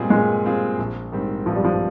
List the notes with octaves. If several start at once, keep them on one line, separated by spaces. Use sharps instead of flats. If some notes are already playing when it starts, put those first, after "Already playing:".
Already playing: A#2 G3 G#3 C4 F4 G#4
A#2 G#3
G3 C4 F4 G#4
A#1
G#2 D#3 G3 C4
A#1 F3
G3
F3